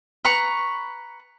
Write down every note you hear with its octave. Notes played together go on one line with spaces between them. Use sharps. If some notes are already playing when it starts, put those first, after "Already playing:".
B4 A#5 C#6